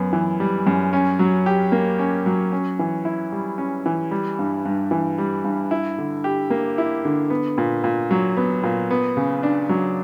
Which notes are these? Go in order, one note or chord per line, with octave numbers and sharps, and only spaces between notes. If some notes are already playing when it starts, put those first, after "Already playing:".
Already playing: F#2 B3
E3
G3
F#2
C#4
F#3
G4
A#3
C#4
F#3
C#4
E3
E4
G3
C#4
E3
G3
G2
G2
E3
G3
G2
E4
D3
G4
A#3
E4
D3
B3
A#2
A#2
F#3
B3
A#2
B3
C#3
D4
F#3